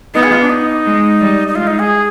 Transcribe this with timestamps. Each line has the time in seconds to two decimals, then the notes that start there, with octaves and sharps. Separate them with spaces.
0.14 B3 D#4
0.23 G#4
0.32 F4
0.41 D4
0.50 D#4
0.85 G#3
1.20 G3
1.48 D#4
1.55 G#3 F4
1.67 D#4
1.79 G#4